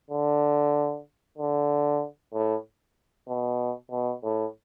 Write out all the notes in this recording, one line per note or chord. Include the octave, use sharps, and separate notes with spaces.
D3
D3
A2
B2
B2
A2